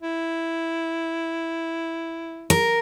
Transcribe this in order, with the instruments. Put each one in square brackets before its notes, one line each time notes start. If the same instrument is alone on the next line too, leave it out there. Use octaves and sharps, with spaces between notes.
[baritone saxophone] E4
[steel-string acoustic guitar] A#4